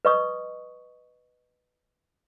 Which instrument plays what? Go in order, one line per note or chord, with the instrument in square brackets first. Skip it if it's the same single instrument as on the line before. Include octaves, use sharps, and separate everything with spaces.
[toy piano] B4 D#5 C#6 D#6